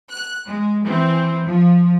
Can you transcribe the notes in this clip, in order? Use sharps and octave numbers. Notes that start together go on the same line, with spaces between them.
F#6
G#3
E3 C4
F3